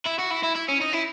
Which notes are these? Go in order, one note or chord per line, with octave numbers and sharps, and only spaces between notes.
E4
F#4
E4
E4
E4
C#4
D#4
E4